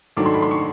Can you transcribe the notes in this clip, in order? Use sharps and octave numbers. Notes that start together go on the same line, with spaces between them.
G#2 D#3 F#3 A3 D4 D6
C6
B5
C6
C#6